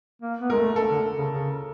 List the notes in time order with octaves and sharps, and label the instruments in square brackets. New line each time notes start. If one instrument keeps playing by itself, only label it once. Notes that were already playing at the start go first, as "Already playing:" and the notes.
[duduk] A#3
B3
[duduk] G#3 [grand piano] A#4
[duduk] A3
[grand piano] A4
[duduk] D3
C#3
C#3